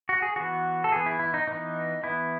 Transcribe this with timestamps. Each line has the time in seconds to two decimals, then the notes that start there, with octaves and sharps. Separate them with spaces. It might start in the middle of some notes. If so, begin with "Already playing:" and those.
0.09 F#4
0.22 G#4
0.36 E3 B3 F#4
0.84 A4
0.92 E3 B3 G#4
1.06 E4
1.19 E4
1.34 D#4
1.47 E3 B3 D#4
2.03 E3 B3 E4